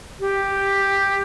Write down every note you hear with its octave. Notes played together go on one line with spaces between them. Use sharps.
G4